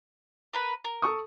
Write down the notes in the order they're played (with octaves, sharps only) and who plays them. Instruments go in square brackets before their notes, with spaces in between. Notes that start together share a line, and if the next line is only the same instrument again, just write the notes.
[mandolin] A#4 B4 B5
A#4
[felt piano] A4 C#6 D#6